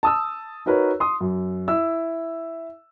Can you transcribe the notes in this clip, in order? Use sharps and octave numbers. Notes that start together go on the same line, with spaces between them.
A5 D#6 E6
D#4 F#4 A#4 B4 C#5
C6 D#6
F#2
E4 E6